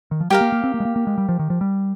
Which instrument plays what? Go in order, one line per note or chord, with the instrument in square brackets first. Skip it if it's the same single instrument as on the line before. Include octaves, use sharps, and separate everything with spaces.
[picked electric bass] D#3
F3
[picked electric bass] G3 [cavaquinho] G4 A#4 F5
[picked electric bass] A#3
A#3
C4
A#3
G#3
A#3
A#3
G#3
G3
F3
D#3
F3
G3